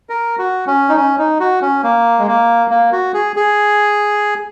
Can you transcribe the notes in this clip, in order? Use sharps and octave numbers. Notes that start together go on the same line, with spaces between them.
A#4
F#4
C#4
D#4
C#4
D#4
F#4
C#4
A#3
G#3
A#3
A#3
F#4
G#4
G#4